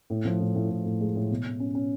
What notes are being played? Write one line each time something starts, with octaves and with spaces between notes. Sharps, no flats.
A2
F3
A2
A2
A2
A2
G#3
A2
B2
B2
C#4
C#4